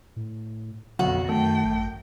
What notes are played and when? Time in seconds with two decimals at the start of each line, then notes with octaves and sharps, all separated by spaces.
0.16 A2
0.99 B1 F2 B2 D3 F#4
1.29 F#2 D#3 A3 G5
1.65 G#1